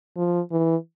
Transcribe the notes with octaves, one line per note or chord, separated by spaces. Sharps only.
F3
E3